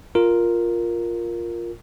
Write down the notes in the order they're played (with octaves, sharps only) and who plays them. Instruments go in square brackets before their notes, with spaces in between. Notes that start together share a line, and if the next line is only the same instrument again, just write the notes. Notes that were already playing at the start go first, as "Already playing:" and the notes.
[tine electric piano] F4 A#4